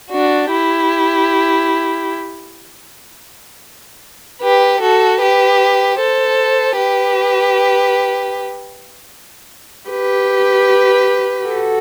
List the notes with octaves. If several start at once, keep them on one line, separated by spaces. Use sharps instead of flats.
D4 F#4
E4 G4
G4 B4
F#4 A4
G4 B4
A4 C5
G4 B4
G4 B4
F#4 A4